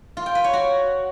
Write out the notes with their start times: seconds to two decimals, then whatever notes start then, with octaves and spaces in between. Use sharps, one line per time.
0.17 F4
0.26 G5
0.35 B4
0.44 C#5
0.53 F#4